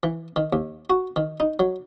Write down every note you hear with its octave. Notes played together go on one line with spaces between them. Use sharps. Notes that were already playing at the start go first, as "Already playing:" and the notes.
E3
D#3
D#2
F#4
D#3
D#4
F#3